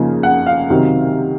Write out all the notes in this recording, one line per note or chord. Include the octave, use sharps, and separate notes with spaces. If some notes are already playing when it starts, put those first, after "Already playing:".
Already playing: C#3 F3 A#3 D#4
F#5
F5
C3 D#3 F#3 C4